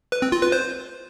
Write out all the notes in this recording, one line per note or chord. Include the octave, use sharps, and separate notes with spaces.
B4
C4
F4
B4
C5